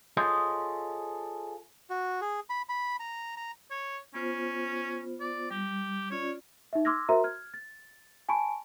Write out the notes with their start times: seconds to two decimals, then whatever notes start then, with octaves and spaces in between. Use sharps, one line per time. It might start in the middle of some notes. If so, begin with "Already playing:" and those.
0.17 F4 G#4 A4 C5 C#5 D#5
1.90 F#4
2.21 G#4
2.50 B5
2.69 B5
3.00 A#5
3.37 A#5
3.71 C#5
4.14 B3 C#4 F4 C5
5.20 D5
5.50 G3 G4
6.11 C#4 F4 C#5 D5
6.73 D#4 E5
6.85 C6 D6 E6 F6 G#6 A#6
7.09 F#4 A#4 C5 E5 A#5 C6
7.24 F6 G#6
7.54 A6
8.29 G#5 A5 B5 C#6 D7